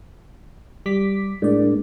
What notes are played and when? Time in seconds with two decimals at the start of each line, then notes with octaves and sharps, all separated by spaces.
0.86 G3 D6 B6
1.42 A2 G#3 A#3 D4 D5